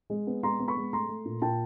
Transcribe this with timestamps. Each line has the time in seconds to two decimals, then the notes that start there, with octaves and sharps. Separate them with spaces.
0.10 G#3
0.27 B3
0.43 G#3 A#5 C6
0.59 B3
0.68 B5 C#6
0.77 G#3
0.93 A3 A#5 C6
1.09 A3
1.25 A#2
1.42 A#2 G5 A5